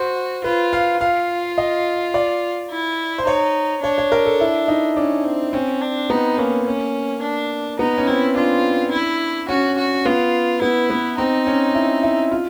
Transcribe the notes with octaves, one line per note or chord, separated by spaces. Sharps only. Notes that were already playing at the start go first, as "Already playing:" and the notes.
Already playing: F#4 C5
F4 B4
F5
F4 F5
D#5
D5
E4
C5
D#4 C#5
D4 C#5
C#5
A#4
A4
E4
D#4
C#4 D4
C4
C4 C#4
D4
B3 D#4
A#3 C#4
C#4
D4
B3 D#4
C#4
C4 E4
D4 F4
E4
C#4 F#4
F#4
B3 F4
B3 E4
B3
C4 D#4
C#4
E4
E4
F4